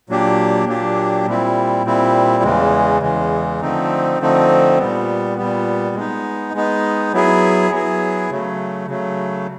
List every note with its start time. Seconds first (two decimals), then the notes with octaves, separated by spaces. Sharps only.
0.09 A#2 F#3 A#3 D4 G4
0.68 A#2 F#3 A#3 D4 G4
1.27 A#2 G3 C4 E4
1.85 A#2 G3 C4 E4
2.43 E2 C#3 E3 G#3
3.02 E2 C#3 E3 G#3
3.61 D3 F3 A3 C4 D#4
4.20 D3 F3 A3 C4 D#4
4.79 A#2 G3 B3
5.37 A#2 G3 B3
5.95 G#3 B3 D#4
6.54 G#3 B3 D#4
7.13 F#3 B3 E4 G#4
7.72 F#3 B3 E4 G#4
8.30 C#3 F#3 A3
8.88 C#3 F#3 A3